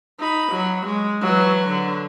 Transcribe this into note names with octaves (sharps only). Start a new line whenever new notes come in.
D#4 B5
F#3
G#3
E3 F#3
D3